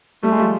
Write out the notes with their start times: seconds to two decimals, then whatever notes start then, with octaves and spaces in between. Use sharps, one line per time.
0.23 G3 A3
0.32 G#3
0.40 F3 G3